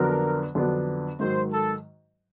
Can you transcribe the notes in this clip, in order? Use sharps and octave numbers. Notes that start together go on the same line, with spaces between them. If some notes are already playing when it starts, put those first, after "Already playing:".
Already playing: F2 D3 F#3 B3 D4 A#4
F2 D3 F#3 B3 D4
G#2 D#3 F#3 C5
A4